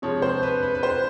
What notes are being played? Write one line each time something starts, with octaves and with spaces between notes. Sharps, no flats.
C3 F3 G#3 C#5
C5
B4
B4
B4
C5